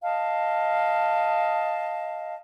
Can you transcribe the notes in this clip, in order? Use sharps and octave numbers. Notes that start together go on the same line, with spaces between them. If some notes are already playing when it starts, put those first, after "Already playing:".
D#5 F5 A5